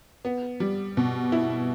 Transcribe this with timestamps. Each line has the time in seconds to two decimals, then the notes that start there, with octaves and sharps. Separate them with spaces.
0.25 B3
0.60 G3
0.97 B2
1.32 E4